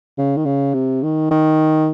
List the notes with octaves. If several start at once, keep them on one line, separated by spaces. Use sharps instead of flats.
C#3
D#3
C#3
C3
D#3
D#3